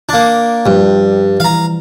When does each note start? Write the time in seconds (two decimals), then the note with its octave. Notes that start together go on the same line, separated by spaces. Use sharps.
0.09 A#3 D4
0.66 G2 F3 G3
1.40 E3 F5 A#5